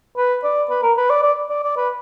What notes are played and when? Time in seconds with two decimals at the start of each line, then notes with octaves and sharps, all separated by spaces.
0.17 B4
0.44 D5
0.69 B4
0.83 A#4
0.97 B4
1.10 D5
1.23 D5
1.49 D5
1.63 D5
1.76 B4